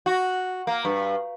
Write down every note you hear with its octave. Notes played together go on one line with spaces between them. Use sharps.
F#4
A#3
G2